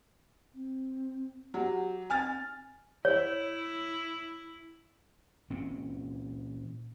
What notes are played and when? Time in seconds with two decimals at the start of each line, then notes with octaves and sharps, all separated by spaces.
0.54 C4
1.54 F#3 G4
2.10 C4 G#5 F6 A6
3.05 E4 C#5
5.50 A#2 E3 C4 C#4